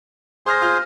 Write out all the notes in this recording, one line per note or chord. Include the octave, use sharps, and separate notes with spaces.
G#4 C5 C6 F6 A#6
F4 F6 G6